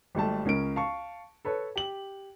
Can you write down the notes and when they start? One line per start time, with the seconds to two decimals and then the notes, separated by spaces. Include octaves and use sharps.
0.15 G#1 G3 A3 A5
0.45 C#2 C#4 A#4 D7
0.76 F5 A5 C#6
1.45 A4 B4 C#5
1.76 G4 F#7